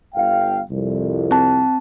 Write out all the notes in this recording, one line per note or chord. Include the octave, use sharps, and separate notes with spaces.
G1 F5 G5
C2 F2
C4 A5